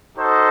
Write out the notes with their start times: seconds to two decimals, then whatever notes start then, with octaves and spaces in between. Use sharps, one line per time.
0.17 D#4 F#4 A4 C5 D#5